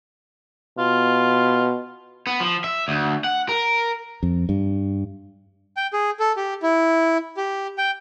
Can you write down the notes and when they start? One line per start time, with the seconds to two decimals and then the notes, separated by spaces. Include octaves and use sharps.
0.79 B2 F4
2.27 B3
2.40 F3
2.64 E5
2.88 D2
3.24 F#5
3.49 A#4
4.23 F2
4.49 G2
5.77 G5
5.93 G#4
6.20 A4
6.36 G4
6.62 E4
7.37 G4
7.78 G5